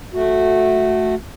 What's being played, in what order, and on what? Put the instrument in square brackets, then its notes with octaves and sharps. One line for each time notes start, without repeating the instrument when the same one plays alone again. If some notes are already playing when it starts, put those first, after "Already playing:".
[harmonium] A3 F#4